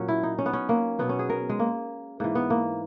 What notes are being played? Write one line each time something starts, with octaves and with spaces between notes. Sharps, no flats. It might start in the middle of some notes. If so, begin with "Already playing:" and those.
Already playing: A#2 F#3 C#4
E4
D#4
C#4
B3
C#4
A#3
B2 F#3 B3
C#4
G#4
A#4
G#3
A#3
G#2 E3 A#3
B3
A#3